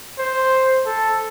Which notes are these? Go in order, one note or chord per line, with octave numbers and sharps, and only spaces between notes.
C5
A4